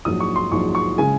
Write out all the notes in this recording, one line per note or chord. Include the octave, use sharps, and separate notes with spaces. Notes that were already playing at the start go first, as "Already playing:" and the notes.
A#1 G#2 F#3 D#6
C#6
C6
A#1 G#2 F#3 C#6
C#6
C#3 G#3 G#5